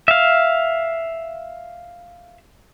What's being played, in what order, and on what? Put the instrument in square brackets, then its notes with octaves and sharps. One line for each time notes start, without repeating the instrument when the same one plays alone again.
[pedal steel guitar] E5 F5